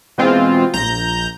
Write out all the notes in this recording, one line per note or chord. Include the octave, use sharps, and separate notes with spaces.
B2 E3 G#3 C4 F4
A#1 A#5 G6